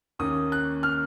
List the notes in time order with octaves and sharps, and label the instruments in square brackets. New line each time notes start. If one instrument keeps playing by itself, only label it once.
[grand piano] D#2 D#3 A#3 C#4 D#6
F#6
F6